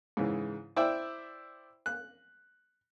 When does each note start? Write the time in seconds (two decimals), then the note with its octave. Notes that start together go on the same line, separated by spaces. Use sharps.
0.17 G#2 C#3 E3
0.76 E4 C5 D5 E5 G5
1.86 F#6